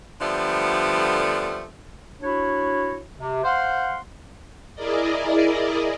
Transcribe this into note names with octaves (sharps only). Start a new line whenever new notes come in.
D3 F3 G3 A3 B3
D4 E4 F#4 C#5
C3
C5 F5 F#5 C6
E4 G#4 A#4 D5 D#5